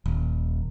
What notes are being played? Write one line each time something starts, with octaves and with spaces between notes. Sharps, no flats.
D#1